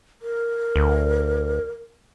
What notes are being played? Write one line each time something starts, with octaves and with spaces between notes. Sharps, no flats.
A#4
D2